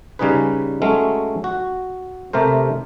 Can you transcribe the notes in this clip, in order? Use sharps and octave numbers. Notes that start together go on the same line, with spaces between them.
C#3 G3 C#4 D#4 G#4 B4
F#3 G#3 A3 C#4
F#4
C3 A3 G4 A#4 C5